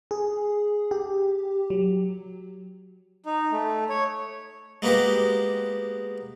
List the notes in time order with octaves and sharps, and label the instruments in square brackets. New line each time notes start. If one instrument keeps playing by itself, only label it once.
[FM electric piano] G#4
G4
F#3
[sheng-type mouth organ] D#4
A3
C#5
[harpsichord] G#3 A#3 B3 F#4 G4